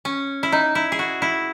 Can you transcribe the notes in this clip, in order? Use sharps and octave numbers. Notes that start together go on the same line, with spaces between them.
C#4
E4
D#4
E4
G#4
F#4
E4